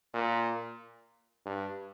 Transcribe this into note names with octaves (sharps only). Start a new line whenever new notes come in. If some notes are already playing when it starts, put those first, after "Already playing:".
A#2
G2